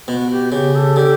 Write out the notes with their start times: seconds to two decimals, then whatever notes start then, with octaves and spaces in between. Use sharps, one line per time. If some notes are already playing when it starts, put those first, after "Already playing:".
0.08 B2 F#4
0.30 G4
0.52 C#3 G4
0.74 A4
0.96 D3 G4